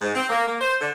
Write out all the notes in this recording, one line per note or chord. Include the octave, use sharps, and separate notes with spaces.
G#2
C4
A#3
A#3
C5
D3